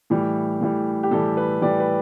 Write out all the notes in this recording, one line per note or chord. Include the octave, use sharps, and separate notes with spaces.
A2 E3 G3
A2 E3 G3
G4
A2 E3 G3 A4
B4
A2 E3 G3 D5
B4